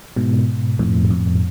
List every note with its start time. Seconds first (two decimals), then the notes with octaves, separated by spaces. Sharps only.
0.16 G#2 B2
0.79 F2 A2
1.10 F2